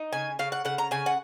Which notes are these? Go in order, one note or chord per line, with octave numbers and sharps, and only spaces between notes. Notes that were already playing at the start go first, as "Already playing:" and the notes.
Already playing: D#4
C#3 G#5
C#3 F5
F#5
C#3 F#5
A#5
C#3 G#5
F#5